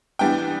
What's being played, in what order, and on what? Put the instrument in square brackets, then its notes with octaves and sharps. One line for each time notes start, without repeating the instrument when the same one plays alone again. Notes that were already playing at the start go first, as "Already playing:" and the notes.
[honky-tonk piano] E3 G3 B3 D4 G5